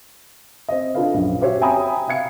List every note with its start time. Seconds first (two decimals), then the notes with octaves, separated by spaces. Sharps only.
0.69 C4 D#5
0.95 D4 F4 A4 B4 F5
1.14 A#1 F#2
1.41 F#4 G4 C5 C#5 E5
1.61 E5 G5 G#5 A#5 B5 D#6
2.08 E5 F5 G#6 C#7